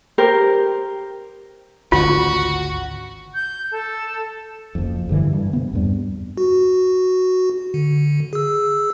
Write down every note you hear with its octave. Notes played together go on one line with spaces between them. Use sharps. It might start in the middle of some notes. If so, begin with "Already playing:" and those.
G4 A#4 C5
G#1 D2 C#3 F4 F#4
G6
A4
F#1 F2
G2 D3 E3
G2
C3 B3
E2 G2 G3
F#4
D3
G#4 E6